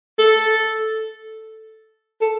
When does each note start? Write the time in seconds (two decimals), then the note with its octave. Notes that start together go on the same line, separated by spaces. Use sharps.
0.18 A4
2.21 A4